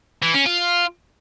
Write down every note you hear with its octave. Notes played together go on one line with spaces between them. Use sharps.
E3
C#4
F4